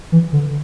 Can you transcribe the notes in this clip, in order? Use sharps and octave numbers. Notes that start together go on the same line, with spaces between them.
E3
D3